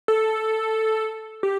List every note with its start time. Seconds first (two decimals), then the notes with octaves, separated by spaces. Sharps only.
0.08 A4
1.43 G4